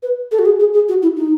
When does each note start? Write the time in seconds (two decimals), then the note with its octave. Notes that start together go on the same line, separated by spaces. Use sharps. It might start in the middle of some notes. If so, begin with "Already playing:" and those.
0.03 B4
0.31 A4
0.39 F#4
0.45 G#4
0.59 G#4
0.74 G#4
0.89 F#4
1.02 E4
1.16 D#4